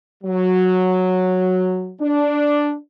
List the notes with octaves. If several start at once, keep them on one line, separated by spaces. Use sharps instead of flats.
F#3
D4